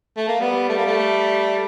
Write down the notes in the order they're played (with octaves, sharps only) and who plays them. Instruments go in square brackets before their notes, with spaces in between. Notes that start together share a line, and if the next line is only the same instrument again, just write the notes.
[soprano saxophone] A3
A#3
[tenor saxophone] G3 [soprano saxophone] B3
[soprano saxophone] A3
A#3
A3